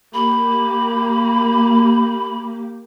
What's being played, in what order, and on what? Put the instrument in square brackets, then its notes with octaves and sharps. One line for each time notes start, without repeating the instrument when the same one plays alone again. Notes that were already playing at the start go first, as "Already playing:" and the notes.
[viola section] A#3 G4 [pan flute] B5